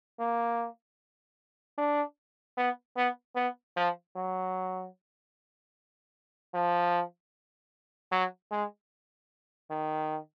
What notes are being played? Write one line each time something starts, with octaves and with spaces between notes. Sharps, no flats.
A#3
D4
B3
B3
B3
F3
F#3
F3
F#3
G#3
D#3